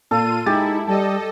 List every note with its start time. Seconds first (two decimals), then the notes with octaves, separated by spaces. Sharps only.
0.11 A#2 F4 A4 D#7
0.46 G#3 D#4 E4 G4 A6
0.87 G3 A4 D#5 A5